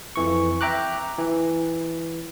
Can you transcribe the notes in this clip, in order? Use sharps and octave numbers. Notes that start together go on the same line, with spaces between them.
F2 E3 C#6
E5 G5 A#5 D6 F#6
E3